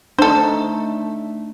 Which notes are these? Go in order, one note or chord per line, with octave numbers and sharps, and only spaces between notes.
A3 D4 D#4 A4 C5